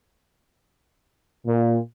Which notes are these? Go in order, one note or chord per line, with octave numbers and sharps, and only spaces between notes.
A#2